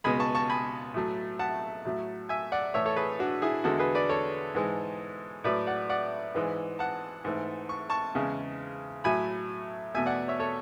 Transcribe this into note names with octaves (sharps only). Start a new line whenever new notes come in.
C#2 B2 G#3 G#5 B5
A5 C#6
A5 C#6
G#5 B5
A2 F#3 A3
F#5 A5
A2 F#3 A3
E5 G#5
D5 F#5
A2 E3 A3 C#5 E5
A4 C#5
G#4 B4
D4 F#4
E4 G#4
E2 D3 G#3 F#4 A4
G#4 B4
B4 D5
A4 C#5
G#2 E3 G#3
A2 F#3 A3 B4 D5
D5 F#5
D5 F#5
G#2 E3 G#3
F#5 A5
G#2 E3 A3
C#6
A5 C#6
E2 C#3 G#3
A2 F#3 A3 G#5 B5
E2 B2 A3 E5 G#5
D5 F#5
C#5 E5
A4 C#5